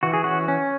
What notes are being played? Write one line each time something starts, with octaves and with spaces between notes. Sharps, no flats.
E3 F#4
G#4
C#4 F#4
C#4